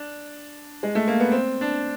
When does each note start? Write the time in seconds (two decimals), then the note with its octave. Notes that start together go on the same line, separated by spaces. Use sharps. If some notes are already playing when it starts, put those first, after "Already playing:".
Already playing: D4
0.83 G#3
0.95 A3
1.07 A#3
1.20 B3
1.31 C4
1.61 D4